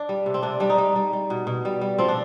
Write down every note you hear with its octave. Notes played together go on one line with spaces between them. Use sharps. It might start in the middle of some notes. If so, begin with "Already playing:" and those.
Already playing: D4
G3
C3
C4
C3 D4
G3 D4
D#4
G3
G3
G3
B2
B2
G3
G3
F3 C4
D4